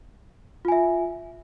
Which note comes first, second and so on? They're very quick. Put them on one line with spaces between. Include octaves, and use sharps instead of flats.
F4 G#5 E5